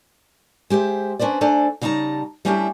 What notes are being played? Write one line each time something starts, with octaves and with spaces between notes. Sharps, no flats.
G#3 G4 C5 E5
C#4 D4 B4 C5 D5
A3 D4 A4 C5 D5 G#5
C#3 G3 D#4 D5 A5 A#5
G3 A3 C#4 D4 E4 G4